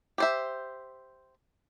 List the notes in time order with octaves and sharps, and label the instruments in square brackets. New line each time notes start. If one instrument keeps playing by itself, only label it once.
[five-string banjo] G4 C5 E5